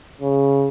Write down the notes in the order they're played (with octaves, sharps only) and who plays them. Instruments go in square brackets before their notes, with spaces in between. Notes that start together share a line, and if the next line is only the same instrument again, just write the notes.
[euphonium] C#3